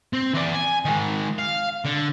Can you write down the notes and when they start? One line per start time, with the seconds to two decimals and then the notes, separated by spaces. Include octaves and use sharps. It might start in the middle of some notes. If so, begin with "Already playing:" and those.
0.13 C4
0.34 E3 D5
0.54 G#5
0.85 D#3 G#3
1.39 F5
1.85 D3